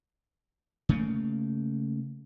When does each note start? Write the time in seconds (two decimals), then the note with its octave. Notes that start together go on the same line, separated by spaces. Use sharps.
0.89 C#3 A3 A#3